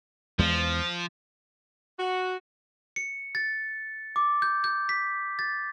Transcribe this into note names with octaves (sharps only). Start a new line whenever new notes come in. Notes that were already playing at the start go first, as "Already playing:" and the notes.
E2 F3 G#3
F#4
C#7
A6
D6
G6
G6
B6
A6